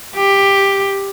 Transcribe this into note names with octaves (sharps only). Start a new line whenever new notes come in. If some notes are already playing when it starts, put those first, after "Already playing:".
G4